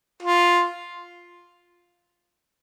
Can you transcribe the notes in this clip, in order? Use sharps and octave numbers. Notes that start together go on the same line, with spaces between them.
F4